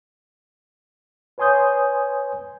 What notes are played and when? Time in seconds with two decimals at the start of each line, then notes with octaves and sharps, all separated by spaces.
1.38 B4 C#5 G#5 C6 D#6 G6